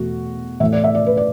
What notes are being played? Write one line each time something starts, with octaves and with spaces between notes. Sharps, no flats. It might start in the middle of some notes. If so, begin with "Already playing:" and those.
Already playing: E2 B2 A3 F#4
A2 E3 A3 E5
D5
E5
D5
B4
D5